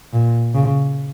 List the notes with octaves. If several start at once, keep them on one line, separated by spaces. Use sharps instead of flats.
A#2
C#3